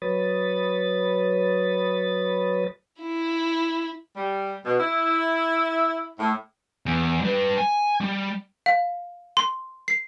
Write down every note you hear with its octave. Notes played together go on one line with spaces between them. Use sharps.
F#3 B4 C#5 B5 D#6 A6
E4
G3
B2
E4
A2
E2
G3 B4
G#5
G3
F5
C6
C7